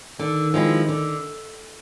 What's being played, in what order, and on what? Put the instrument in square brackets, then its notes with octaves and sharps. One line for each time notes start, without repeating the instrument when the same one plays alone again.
[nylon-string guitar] D3 [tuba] D#3
[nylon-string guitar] F3 G#3 C4 E4
D3